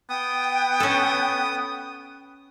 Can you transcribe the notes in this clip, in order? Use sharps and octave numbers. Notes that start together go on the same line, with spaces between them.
B3 G5 D#6
C#4 A4